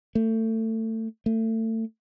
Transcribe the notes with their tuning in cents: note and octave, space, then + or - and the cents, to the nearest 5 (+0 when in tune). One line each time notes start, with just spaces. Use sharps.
A3 +25
A3 +30